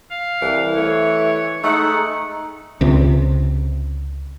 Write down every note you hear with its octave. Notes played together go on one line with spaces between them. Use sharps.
F5
C2 E3
A3 C#5
G#3 A3 D#4 F#5
C#2 C3